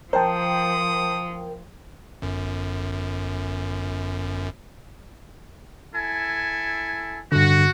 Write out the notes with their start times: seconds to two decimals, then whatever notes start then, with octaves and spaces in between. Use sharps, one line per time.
0.13 F3 A#4 C5 G5 A5 D#6
2.22 G1 F#2
5.95 E4 A4 G#5
7.32 G2 D3 F#4